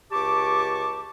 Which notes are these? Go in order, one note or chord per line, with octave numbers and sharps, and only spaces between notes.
C#2 G4 A5 C#6 D6